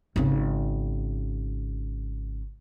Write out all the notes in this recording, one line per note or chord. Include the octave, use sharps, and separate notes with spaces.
G#1 C#3